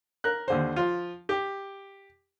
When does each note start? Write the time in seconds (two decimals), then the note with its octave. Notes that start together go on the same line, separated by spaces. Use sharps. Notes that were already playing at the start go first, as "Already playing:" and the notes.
0.24 A#4 F#6
0.48 D#2 D3 C5
0.76 F3 F4
1.29 G4